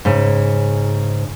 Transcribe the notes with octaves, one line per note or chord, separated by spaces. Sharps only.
G#2 C#3